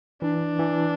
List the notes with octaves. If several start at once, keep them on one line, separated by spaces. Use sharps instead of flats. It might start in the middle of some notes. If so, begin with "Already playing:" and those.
E3 D4
E3